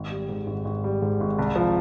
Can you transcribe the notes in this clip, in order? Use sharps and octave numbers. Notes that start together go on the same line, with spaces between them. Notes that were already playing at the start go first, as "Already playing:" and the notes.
Already playing: G#1
G3
G#2
G#1
G#1
G3
G#2
G#1
C2
F3